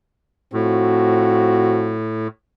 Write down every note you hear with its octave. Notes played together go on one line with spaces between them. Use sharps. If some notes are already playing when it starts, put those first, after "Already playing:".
A2 F3 C4 F#4